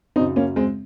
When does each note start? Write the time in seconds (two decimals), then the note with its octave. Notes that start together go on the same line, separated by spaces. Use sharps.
0.16 F#2 C#3 C4 D#4
0.36 A#3 C#4
0.56 G#3 C4